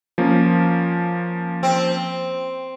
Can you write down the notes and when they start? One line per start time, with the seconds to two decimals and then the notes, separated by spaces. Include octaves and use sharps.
0.18 F3 A#3 C#4
1.63 C4